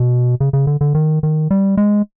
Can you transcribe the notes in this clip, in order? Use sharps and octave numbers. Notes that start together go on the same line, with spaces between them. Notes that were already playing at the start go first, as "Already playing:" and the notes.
Already playing: B2
C#3
C#3
D3
D3
D#3
D#3
G3
G#3